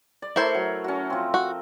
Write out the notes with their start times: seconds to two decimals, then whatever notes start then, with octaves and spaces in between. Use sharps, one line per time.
0.22 D5
0.36 A3 E4 A#4 C5 C#5
0.55 F#3
0.84 C#4 F#4
1.10 F3 C4
1.34 F#4